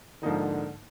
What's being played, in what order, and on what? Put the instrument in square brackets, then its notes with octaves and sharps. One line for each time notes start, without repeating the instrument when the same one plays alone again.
[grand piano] G#2 F3 A#3 D#4 [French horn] D3